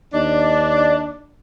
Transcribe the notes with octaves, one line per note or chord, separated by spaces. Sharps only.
D#2 D4 D5 D#5